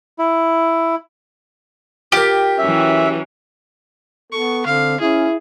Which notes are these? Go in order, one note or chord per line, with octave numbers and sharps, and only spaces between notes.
E4
F4 G4 A#4
E3 F#3 C#4 E5
B3 A4 C#6
D3 C4 F5
C#4 E4 G#4